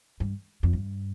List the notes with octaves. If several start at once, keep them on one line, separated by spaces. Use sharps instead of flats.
G2
F2
G2